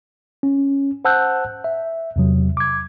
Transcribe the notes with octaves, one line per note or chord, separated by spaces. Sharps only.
C#4
C5 F#5 A5 E6 F#6 G6
E5
E2 C3 F#3
D6 G#6